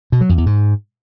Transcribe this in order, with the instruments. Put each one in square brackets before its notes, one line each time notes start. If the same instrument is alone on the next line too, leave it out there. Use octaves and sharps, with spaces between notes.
[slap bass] B2
F#3
F2
E2
G#2